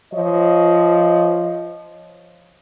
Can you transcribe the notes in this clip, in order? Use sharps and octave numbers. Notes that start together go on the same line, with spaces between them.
F3 C#5 D#5